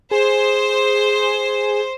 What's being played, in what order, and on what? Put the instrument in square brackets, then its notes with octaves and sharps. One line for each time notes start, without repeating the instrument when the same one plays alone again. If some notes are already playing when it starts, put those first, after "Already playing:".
[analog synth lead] G#4 [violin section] C5